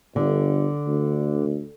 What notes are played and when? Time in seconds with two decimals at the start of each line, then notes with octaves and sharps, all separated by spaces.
0.16 G1 D3
0.88 D2